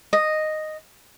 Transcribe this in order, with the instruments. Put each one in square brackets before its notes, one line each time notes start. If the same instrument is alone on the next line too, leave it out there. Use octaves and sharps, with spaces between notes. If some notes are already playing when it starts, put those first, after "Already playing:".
[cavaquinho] D#5